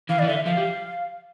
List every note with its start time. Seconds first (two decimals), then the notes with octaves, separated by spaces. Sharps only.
0.09 E3 F5
0.19 D5
0.23 E3
0.28 D3 E5
0.46 F3 F5
0.57 G3